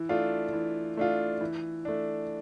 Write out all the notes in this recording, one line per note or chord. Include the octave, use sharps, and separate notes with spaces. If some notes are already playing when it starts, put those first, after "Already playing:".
Already playing: E3
A3 D4 F4
E3
A3 D4 F4
E3
A3 D4